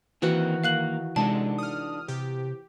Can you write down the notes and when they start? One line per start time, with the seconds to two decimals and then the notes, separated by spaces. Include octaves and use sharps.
0.22 D#3 E3 A#3 C4 F#4 F#5
0.64 A#3 F5 F#6 F#7
1.16 C3 G#3 D4 D#4 A4 A5
1.58 D#6 F6
2.08 C3 G4